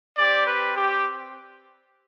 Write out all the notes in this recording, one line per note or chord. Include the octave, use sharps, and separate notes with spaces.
C4 G4 D5
B4
G4